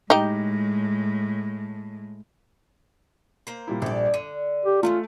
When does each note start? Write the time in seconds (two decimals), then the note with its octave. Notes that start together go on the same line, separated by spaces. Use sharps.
0.10 A2 G#3 D#4 G4
3.47 A#3 C5
3.67 A#2 G3 E4
3.82 A#1 G3 A4 D5
4.14 D3 D#7
4.66 G4
4.83 G#3 A3 B3 C#4 F4